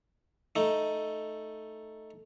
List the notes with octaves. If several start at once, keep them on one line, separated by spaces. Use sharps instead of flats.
A3 D#4